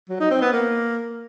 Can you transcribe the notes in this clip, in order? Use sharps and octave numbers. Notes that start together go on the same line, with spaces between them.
F#3
D#4
C4
B3
A#3